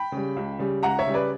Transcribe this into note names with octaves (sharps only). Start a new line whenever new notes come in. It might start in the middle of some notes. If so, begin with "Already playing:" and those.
Already playing: G5 B5
C#3 G3
C#2
C#3 G3
C#2 F#5 A#5
C#5 E5
C#3 G3
B4 D5